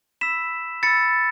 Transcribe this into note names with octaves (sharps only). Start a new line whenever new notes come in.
B5 E6 B6 E7
B5 E6 A6 C#7